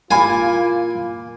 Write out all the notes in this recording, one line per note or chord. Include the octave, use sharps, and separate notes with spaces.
A#2 A#3 E4 F4 G#5 B5